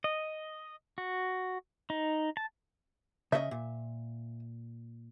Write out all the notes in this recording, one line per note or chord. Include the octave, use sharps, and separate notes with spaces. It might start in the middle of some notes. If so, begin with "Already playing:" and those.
D#5
F#4
D#4
A5
C#3 C#4 D#5 E5
A#2